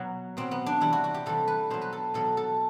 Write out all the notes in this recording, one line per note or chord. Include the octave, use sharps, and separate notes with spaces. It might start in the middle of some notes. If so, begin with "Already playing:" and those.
Already playing: B2 F#3
B2 F#3 C4
B3
D4
C3 E3 G3 E4
F#4
F#4
G4
C3 E3 G3 A4
B4
B2 F#3 C5
B4
A4
B2 F#3 A4
A4